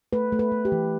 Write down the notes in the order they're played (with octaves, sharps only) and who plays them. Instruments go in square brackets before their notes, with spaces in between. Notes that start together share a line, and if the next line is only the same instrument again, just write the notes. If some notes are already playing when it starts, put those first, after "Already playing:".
[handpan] A3 B4
A3
B4
A3
G4
E3